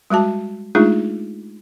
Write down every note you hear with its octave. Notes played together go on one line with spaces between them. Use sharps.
G3 G#3 F#4 A5
G#3 A3 D4 D#4 F4 G#4